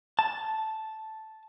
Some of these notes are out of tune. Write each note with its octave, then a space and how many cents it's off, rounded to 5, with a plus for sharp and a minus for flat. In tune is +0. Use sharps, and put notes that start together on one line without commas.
A5 -5